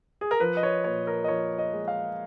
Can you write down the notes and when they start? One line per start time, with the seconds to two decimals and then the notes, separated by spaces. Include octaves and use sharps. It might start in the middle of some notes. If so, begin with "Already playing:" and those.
0.21 G#4
0.31 A#4
0.40 F3 B4
0.57 D#5
0.63 C#5
0.84 A#2 C#5
1.07 A#4
1.24 D#5
1.28 F3 C#5
1.59 D#5
1.73 G#3
1.88 F5